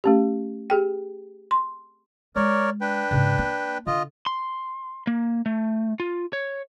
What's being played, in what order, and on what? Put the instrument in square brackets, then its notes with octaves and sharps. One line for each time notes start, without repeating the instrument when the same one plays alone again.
[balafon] A3 C#4 G4
G4 G#4 G5
C6
[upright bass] G#3 [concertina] A#4 C#5 D5
[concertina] D4 B4 G5
[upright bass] G#2 C#3
A#3
[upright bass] D3 [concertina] F4 D#5
[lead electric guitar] C6
A#3
A3
F4
C#5